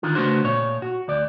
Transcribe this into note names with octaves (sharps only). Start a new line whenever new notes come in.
D3 D#3 F4
C#3 A3 B3 D4 F#4 C5
A#2 C#5
F#4
D2 D5